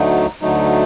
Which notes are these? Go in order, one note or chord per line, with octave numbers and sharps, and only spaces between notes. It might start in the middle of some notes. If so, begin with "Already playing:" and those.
Already playing: D2 D3 F#3 A3 D#4
D2 D3 F#3 A3 D#4